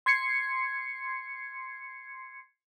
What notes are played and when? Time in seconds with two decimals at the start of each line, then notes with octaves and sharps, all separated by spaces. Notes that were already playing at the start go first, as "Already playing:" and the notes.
0.06 C6 G#6 C7 C#7